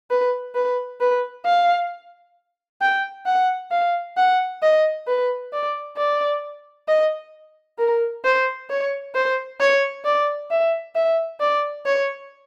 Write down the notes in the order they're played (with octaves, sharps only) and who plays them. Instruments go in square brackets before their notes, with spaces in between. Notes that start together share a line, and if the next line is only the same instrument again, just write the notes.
[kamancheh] B4
B4
B4
F5
G5
F#5
F5
F#5
D#5
B4
D5
D5
D#5
A#4
C5
C#5
C5
C#5
D5
E5
E5
D5
C#5